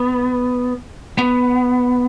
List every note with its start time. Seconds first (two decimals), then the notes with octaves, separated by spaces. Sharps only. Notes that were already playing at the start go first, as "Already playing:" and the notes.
Already playing: B3
1.19 B3